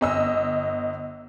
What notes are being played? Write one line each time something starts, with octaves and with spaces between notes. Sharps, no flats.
G1 D#5 E6